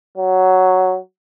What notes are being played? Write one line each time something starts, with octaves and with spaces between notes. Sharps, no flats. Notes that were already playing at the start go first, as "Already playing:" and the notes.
F#3